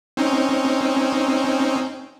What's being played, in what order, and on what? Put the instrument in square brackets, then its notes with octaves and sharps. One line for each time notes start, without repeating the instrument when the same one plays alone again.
[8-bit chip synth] C4 C#4 D#4